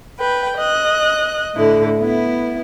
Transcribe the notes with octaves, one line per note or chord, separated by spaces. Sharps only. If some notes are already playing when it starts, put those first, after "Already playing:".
B4 G5
D#5 F#6
A2 D3 E4
B3 E4